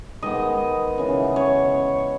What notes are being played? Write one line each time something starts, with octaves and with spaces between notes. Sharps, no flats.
D#3 G#3 B3 D#5
C#3 E3 B3
C#5